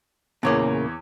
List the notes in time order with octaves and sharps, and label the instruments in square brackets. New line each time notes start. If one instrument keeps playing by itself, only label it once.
[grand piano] E2 C#5 D6 [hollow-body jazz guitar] A#2 C#3 A#3